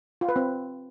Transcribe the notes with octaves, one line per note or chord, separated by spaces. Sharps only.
F4
B4
C4